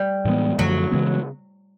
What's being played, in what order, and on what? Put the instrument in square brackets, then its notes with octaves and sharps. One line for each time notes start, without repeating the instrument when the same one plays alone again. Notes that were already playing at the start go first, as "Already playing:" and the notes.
Already playing: [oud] G3
[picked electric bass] A2 E3 G#3 B3
[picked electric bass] F#2 D3 F3 A3 [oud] F#3
[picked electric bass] C#3 E3 G#3 B3